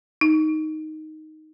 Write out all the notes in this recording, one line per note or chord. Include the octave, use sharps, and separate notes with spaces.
D#4